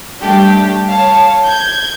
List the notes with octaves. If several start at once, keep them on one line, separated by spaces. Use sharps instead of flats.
G3 A3 D4 G4
C#5 F5 A5
G6 G#6